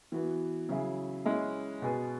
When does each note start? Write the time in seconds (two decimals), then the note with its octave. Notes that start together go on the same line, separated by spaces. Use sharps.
0.12 E3 B3 F#4
0.69 C#3 F#3 E4 G#4
1.25 G#3 C#4 E4
1.82 B2 B3 G#4